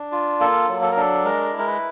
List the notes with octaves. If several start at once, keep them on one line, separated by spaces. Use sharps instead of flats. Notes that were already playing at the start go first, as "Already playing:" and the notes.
Already playing: D4
F4
A#3 A4
F#3
A4
A#4
D4 A4
G#3 A#4
E4
A#4
B4